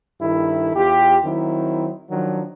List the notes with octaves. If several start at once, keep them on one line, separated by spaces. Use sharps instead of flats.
G2 D#3 E4 A4
E2 F4 G4
D#3 F#3 C4 E4
D#3 F3 F#3 D4